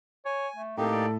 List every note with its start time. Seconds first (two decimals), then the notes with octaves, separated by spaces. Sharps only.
0.26 C#5 G#5
0.56 A3
0.78 A2 A#3 C4 D#4 G4 A4
0.92 D5